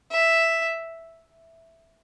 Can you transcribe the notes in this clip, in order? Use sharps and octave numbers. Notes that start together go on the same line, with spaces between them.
E5